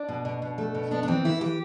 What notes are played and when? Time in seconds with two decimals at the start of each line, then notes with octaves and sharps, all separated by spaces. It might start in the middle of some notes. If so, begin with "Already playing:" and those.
Already playing: D4
0.09 B2
0.25 B2
0.42 B2
0.58 A3
0.75 B2
0.91 B3 D4
1.03 D4
1.08 E3 C4
1.24 E3 E4
1.41 E3 G4